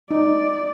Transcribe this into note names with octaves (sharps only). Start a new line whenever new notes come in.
D#4 D5